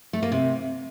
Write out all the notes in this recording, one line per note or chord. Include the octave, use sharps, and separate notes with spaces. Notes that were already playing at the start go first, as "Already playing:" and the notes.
A3
A#3
C3